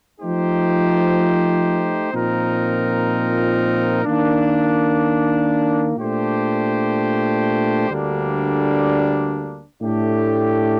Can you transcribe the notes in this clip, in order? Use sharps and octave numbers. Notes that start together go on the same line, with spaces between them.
F3 A3 D#4 G4 C5
A#2 F3 C4 D#4 A#4
D#3 A#3 D4
A#2 A3 D4 G4 C5
D2 D3 G3 A#3 D4
A2 A3 D4 G4